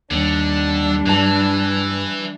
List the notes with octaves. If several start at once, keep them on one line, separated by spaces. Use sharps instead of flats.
D#2 D3 G3 D4
G2 E3 A5